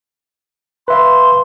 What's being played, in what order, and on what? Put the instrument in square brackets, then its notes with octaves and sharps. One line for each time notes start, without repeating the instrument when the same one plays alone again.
[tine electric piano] B4 E5 F5 [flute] C6